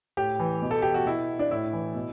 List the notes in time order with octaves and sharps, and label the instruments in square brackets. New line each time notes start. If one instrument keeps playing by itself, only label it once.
[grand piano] A2 G4
E3
B2
A4
G4
F#4
B2 E4
D4
A2 E4
E3
B2